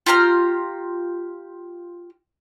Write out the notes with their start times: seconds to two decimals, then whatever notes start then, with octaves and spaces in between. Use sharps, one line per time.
0.06 F4 G4 A#5 F6